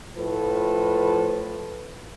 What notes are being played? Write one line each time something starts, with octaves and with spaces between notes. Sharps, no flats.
A2 F3 A4 B4